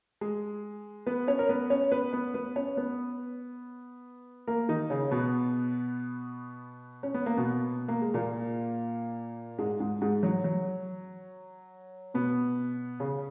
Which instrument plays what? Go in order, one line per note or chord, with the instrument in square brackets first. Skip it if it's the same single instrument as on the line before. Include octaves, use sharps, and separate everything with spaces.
[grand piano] G#3 G#4
B3 B4
C#4 C#5
A#4
B3 B4
C#4 C#5
B3 B4
B3 B4
B3 B4
C#4 C#5
B3 B4
A#3 A#4
D#3 D#4
C#3 C#4
B2 B3
C#4
B3
A#3
B2 B3
A#3
G#3
A#2 A#3
G#2 G#3
G#2 G#3
G#2 G#3
F#3
F#3
B2 B3
C#3 C#4